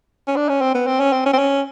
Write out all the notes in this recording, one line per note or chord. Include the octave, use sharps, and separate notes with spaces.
C#4
D4
C#4
C4
B3
C4
C#4
C4
C#4
C4
C#4